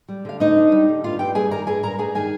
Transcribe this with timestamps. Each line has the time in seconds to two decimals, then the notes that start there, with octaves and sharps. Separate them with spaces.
0.09 G3
0.25 D3 F5
0.40 D2 D#4 D#5
0.57 D4
0.72 G3
0.89 D3
1.04 G2 F4 F5
1.19 G2 G4 G5
1.35 G3 G#4 G#5
1.51 D#3 A#4 A#5
1.67 G2 G#4 G#5
1.83 G2 A#4 A#5
1.98 G3 G#4 G#5
2.15 D#3 G#4 G#5